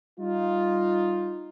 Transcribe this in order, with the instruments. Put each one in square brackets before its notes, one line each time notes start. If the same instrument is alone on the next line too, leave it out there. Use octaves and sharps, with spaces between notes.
[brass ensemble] G3 D#4 F4